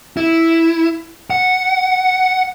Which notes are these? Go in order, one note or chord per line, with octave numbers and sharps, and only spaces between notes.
E4
F#5